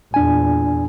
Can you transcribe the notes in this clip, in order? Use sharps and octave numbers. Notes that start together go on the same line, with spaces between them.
E2 A#2 D4 G#5